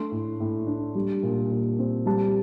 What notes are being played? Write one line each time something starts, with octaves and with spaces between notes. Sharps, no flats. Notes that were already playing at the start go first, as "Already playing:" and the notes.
Already playing: A3 D4 C6
A2
A2
D4
G3
A#2
A#2
C4
G3 A5